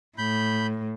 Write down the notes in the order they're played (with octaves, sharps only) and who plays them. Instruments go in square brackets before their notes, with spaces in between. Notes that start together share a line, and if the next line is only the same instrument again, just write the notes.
[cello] A2 [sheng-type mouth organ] B5 G6